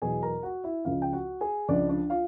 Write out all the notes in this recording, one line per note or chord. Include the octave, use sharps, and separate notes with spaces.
E2 B2 F#3 G#4 G#5
A#4 A#5
F#4 F#5
E4 E5
C#2 C#3 F3 F4 F5
G5
F#4 F#5
G#4 G#5
C#2 C#3 F3 D4 D5
D4 D5
F4 F5